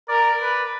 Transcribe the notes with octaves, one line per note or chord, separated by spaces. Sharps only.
A#4 D5
B4